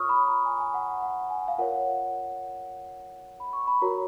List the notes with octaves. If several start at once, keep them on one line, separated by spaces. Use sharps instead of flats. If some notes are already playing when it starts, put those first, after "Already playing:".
Already playing: F4 A#4 C#5 C#6 D#6 F6
B5
A#5
G#5
G#5
F#5
F#5
F#5
G#5
F5
F4 A#4 C#5 F#5
B5
C#6
B5
F#4 A#4 C#5 A#5